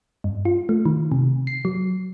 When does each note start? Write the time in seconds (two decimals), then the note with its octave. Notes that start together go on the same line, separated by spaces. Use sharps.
0.24 G2
0.45 F4
0.69 A3
0.85 D#3
1.12 C3
1.47 C7
1.65 F#3